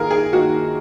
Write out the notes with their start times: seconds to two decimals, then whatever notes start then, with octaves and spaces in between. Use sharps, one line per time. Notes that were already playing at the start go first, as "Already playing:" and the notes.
Already playing: D#3 A#3 F4 G#4 A#4
0.11 G#4
0.33 D#3 A#3 F#4